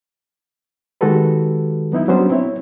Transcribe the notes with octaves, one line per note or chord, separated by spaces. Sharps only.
D#3 G#3 F#4 G4 A4 B4
F#3 B3 D#4 E4
F#3 G3 B3 C#4 D4 C5
C4 E4 C#5